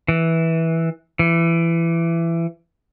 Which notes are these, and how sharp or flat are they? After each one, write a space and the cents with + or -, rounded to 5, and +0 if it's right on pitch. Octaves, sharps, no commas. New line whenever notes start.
E3 -10
E3 +20